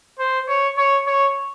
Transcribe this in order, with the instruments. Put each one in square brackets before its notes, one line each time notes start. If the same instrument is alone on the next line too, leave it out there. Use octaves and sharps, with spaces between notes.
[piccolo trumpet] C5
C#5
C#5
C#5